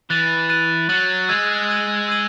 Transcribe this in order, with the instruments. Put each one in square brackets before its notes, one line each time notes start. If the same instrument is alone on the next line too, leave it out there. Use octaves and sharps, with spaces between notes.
[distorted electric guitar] E3 [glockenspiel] F#6 A6 D#7
[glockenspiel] F#6 A6 D#7
[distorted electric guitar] F#3 [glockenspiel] F#6 A6 D#7
[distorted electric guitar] G#3 [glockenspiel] E6 G#6 D#7 F#7
[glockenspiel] E6 G#6 D#7 F#7
E6 G#6 D#7 F#7